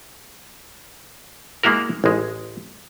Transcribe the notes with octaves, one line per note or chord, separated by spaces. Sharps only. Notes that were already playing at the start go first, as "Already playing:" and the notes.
G#3 A#3 E4 F#4 A#4
A1 G#3